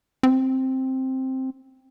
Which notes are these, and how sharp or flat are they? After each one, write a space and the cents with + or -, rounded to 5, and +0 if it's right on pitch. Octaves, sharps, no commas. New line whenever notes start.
C4 +5